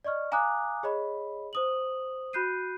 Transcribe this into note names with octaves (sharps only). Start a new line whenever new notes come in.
D5 D#5 C#6 F6
F5 G#5 A#5 D6 D#6 F#6
G#4 C#5 D#5 B5
C5 D#6 F#7
F#4 B5 F#6 G6 C7 D#7